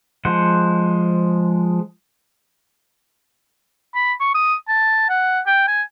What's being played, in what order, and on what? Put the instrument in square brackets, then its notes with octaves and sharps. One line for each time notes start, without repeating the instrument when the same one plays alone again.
[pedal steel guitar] F3 G#3 C5 F#5
[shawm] B5
C#6
D#6
A5
F#5
G5
G#5